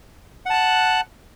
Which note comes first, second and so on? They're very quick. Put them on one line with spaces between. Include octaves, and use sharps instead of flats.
F#5 A5 F#6